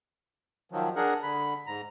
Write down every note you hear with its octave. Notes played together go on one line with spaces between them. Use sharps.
D#3 F3 F#3
D4 G#4 A#4 F#5
D3 B5
G#2 A#5